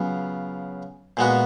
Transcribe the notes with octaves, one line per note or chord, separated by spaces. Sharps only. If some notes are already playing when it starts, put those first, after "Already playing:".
Already playing: C#3 F#3 B3 F4
A#2 G#3 B3 F#4